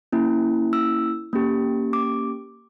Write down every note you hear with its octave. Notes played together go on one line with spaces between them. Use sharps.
A#3 C#4 E4
E6
A#3 C#4 G4
D6